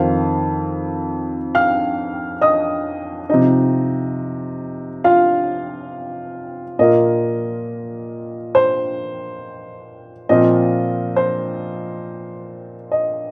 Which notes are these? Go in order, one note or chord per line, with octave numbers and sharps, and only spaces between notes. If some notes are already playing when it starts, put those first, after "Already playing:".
Already playing: F2 D#3 C4 F5
F5 F6
D#5 D#6
C3 F3 D#4 D#5
F4 F5
A#2 A#3 F4 D#5
C5
A#2 F3 C4 F4 D#5
C5
D#5